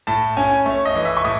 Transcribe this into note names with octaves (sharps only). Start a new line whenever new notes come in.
A2 A5
C#4 G#5
A3 C#5
D#5
E3
E5
C#6
A2 D#6